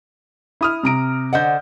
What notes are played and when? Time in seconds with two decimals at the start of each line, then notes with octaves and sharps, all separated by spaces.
0.61 E4 D#6 F6
0.83 C3 A#5 D7
1.33 D3 C5 D#5 F#5 G6